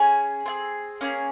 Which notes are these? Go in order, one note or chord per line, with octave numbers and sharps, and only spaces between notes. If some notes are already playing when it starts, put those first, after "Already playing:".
Already playing: C#4 G#4 G#5
C4 F4 G#4
A#3 C#4 F4 G#4